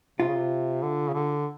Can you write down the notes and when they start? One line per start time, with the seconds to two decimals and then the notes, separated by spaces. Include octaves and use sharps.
0.19 C3 F4
0.28 C#3
0.36 C3
0.83 D3
1.08 C#3
1.13 D3